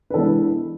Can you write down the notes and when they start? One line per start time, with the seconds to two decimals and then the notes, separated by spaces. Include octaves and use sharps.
0.10 B4
0.14 E3 G#3 B3 D4 A4
0.24 B4